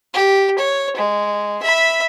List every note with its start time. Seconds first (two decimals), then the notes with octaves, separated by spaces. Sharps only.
0.14 G4
0.59 C#5
0.97 G#3
1.63 E5 B5